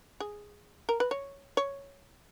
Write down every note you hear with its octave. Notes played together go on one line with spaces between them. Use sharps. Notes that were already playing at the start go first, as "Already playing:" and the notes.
G#4
A#4
B4
C#5
C#5